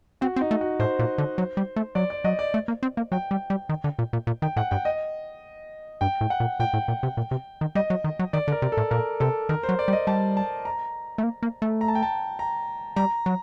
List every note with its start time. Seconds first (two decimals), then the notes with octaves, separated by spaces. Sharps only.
0.21 C4 F#4
0.36 C4
0.41 D#4
0.51 A3
0.61 F#4
0.80 A2 C5
0.99 A#2
1.18 D3
1.38 F#3
1.57 G3
1.76 A3
1.95 F#3 D5
2.10 D5
2.24 F#3 D#5
2.39 D5
2.54 A3
2.68 A#3
2.83 C4
2.97 A#3
3.12 F#3 G5
3.31 G3
3.50 G3
3.69 D#3
3.84 D3
3.99 A#2
4.13 A#2
4.27 A#2
4.42 D#3 G5
4.56 A2 F#5
4.71 G2 G5
4.85 D#5
6.01 G2 G5
6.21 A2
6.30 F#5
6.40 A#2
6.60 A#2 G5
6.73 A2
6.88 A#2
7.03 C3
7.17 A#2
7.31 C3
7.61 D#3
7.75 G3 D#5
7.90 F#3
8.04 D#3
8.19 F#3
8.33 D#3 D5
8.48 D3
8.52 A#4
8.62 C3
8.72 A4
8.77 A2
8.91 A#2 A#4
9.20 C3 A4
9.49 D#3 A#4
9.63 C5
9.69 F#3
9.79 D5
9.88 G3
9.93 D#5
10.07 G3 A5
10.37 A5
10.65 A#5
11.18 A3
11.23 A#3
11.43 A#3
11.62 A3
11.81 A#5
11.88 A5
11.95 G5
12.03 A5
12.39 A#5
12.96 G3 A#5
13.26 F#3